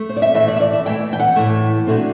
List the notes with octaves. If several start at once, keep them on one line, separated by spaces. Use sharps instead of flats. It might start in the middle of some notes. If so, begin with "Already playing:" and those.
Already playing: A3
C5
D5
E5
A2 E3 A3 E5
D5
E5
D5
E5
A2 E3 A3 G5
G5
F#5
A2 E3 A3
D3 F#3 A3 C4